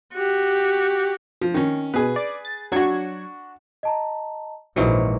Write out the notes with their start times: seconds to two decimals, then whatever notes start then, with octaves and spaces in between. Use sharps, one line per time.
0.14 F#4 G4
1.41 F3
1.54 D#3 C#4
1.94 B2 G#4 B4
2.16 D5
2.45 A6
2.72 F#3 D4 F#4 C#6 G#6
3.83 D#5 A5 A#5
4.76 A#1 G#2 E3 F#3 C#7